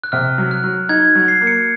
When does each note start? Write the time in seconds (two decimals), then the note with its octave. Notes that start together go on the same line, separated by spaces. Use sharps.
0.04 F#6
0.12 C3 F6
0.38 F#3
0.51 F#6
0.64 F#3
0.89 D#4 G#6
1.15 F#3
1.28 C7
1.41 A#3
1.47 C#7